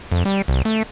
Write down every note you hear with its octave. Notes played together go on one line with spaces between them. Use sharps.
F2
G3
C2
A3